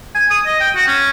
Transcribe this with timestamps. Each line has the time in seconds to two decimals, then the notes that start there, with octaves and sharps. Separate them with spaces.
0.15 G#5
0.30 D#6
0.46 D#5
0.60 G5
0.75 F#4
0.87 C#4